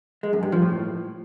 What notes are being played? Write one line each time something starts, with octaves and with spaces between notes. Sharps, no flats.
G#3
F#2
G2
F3
A2